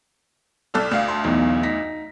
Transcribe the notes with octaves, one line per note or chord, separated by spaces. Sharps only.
C2 A4 D5 F6
D2 F5
A5 C6
B1 E2 D#4
D#4 A#6 B6